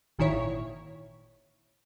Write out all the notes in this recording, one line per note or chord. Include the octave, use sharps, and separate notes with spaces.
G#1 A#2 D#3 E4 C#5